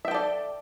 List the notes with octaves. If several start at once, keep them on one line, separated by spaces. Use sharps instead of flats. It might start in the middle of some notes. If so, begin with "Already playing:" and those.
A4 D5 E5 G5